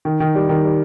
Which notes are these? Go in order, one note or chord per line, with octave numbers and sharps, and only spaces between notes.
D#3
D#3
G3
D#3
G3